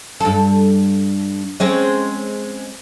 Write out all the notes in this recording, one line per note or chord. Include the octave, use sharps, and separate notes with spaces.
G2 A4
G#3 C4 C#4